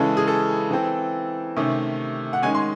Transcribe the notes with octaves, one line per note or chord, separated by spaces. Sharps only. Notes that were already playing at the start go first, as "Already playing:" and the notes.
Already playing: C#3 E3 G#3 C#4 A4
G#4
A4
E3 C4
C3 D#3 A3 C#4
F#5
D#3 G#3 C#4 G#5
C6